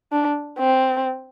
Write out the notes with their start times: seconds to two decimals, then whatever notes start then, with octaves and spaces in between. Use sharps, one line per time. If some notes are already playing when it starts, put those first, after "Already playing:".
0.12 D4
0.59 C4